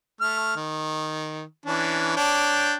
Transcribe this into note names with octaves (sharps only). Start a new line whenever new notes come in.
A3 F6
D#3
E3 C#4 D4
D4 C#5 G5